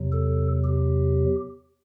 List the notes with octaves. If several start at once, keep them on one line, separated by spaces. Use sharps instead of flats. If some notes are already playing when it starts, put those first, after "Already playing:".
Already playing: E2 C3 F#3
A4
G4